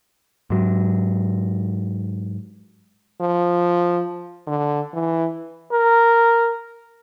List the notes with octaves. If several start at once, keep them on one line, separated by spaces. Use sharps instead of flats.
G#2 F#3
F3
D3
E3
A#4